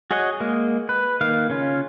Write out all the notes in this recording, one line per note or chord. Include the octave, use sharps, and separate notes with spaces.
F#4 G#4 C#5 D#5 F#5
G#3 A#3
B4
D#3 A#3 F5
C#3 C#4 F4